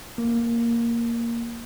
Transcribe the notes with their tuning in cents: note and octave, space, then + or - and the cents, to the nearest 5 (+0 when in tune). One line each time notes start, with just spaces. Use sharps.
A#3 +0